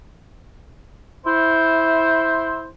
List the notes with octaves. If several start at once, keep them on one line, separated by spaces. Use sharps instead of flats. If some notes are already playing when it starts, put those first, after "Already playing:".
E4 C5